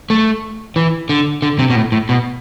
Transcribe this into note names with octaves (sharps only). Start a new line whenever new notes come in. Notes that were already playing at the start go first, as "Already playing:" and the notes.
A3
E3
D3
D3
C3
B2
A2
A2
B2